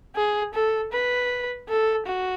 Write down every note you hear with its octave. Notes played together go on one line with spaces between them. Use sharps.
G#4
A4
B4
A4
F#4